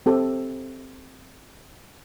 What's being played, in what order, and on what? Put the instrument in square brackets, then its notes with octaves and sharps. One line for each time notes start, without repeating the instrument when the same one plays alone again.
[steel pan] C4 G4 A4